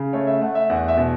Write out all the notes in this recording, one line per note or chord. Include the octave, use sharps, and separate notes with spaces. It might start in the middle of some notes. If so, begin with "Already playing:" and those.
Already playing: C#3
A3 C#5
E5
A3 F#5
E5
E2 F#5
E5
B2